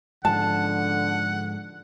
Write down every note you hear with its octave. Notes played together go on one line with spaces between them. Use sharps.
G#2 D3 F3 F#5 A5